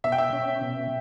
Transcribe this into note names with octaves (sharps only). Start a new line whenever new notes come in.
B2 E5
G5
E5
C#4
B2